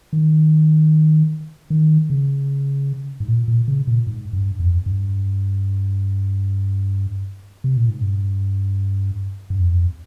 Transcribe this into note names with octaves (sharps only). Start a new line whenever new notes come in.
D#3
D#3
C#3
G#2
A#2
A#2
C#3
A#2
G#2
G2
F2
G2
C3
A#2
G#2
G2
G2
F2